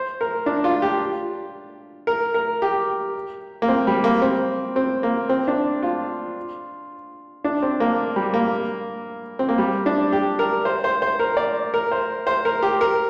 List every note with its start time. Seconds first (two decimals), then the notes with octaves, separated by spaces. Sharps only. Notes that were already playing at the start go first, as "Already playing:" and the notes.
Already playing: C5
0.21 A#4
0.46 D4
0.64 F4
0.82 G4
2.07 A#4
2.34 A#4
2.62 G4
3.62 A#3
3.68 C4
3.87 G3
4.04 A#3
4.22 C4
4.76 C4
5.03 A#3
5.29 C4
5.48 D4
5.83 F4
7.44 D4
7.62 C4
7.80 A#3
8.16 G3
8.34 A#3
9.39 C4
9.49 A#3
9.58 G3
9.86 D4
10.13 G4
10.39 A#4
10.65 C5
10.84 C5
11.02 C5
11.19 A#4
11.37 D5
11.74 A#4
11.91 C5
12.27 C5
12.45 A#4
12.63 G4
12.81 A#4